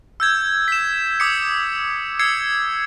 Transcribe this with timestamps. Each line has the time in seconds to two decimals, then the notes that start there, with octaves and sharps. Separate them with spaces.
0.20 E6 G6 G#6
0.68 B6 E7
1.20 D6 D#6 B6 C#7
2.19 E6 G#6 C7 C#7